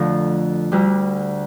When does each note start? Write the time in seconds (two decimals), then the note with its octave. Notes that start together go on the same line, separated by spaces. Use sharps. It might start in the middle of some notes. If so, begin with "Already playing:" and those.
Already playing: F2 D3 F3 A3 A#5
0.72 D2 D3 G3